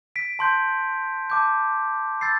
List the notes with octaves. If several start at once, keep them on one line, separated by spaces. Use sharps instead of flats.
B6 D7
A5 C6 G6
A5 D6 G6
B5 E6 G6 A6 C7